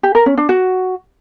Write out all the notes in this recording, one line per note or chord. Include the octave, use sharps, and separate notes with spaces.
G4
A#4
C#4
D4
F#4